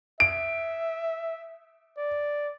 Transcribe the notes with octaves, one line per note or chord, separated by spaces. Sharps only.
E5 D7
D5